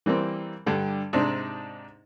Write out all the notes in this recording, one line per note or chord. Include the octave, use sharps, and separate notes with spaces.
E3 G3 A#3 C4
G2 D3 G3
G#2 C3 D4 D#4